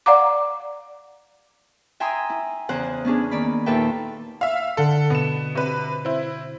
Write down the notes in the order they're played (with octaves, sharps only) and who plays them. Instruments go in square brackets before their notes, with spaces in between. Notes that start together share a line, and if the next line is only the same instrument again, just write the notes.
[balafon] D5 F5 F#5 A#5 D6
[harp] E5 G5 G#5 A#5 C6 D#6
E4
E2 C#3 C5 F#5 F#6
B3 C#4 D4 G#4
D#3 A#3 D5 B5
D#2 A#2 A4 B4 E5 G5
[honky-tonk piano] E5 F5 [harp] F6
[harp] D3 F#5 D7 [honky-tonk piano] A4
[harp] B2 [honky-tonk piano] B3 E7
[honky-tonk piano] C3 B4
C4 E4